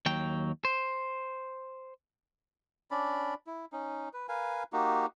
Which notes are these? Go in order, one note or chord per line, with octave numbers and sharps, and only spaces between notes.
D#2 F#3 G5
C5
C#4 D4 D5 B5
E4
C#4 D#4
B4
A#4 B4 F5 G#5
A#3 D#4 F#4 G4